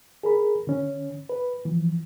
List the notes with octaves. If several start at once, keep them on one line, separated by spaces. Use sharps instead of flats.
G#4 A#4 B5
D3 C#4
B4
E3 F3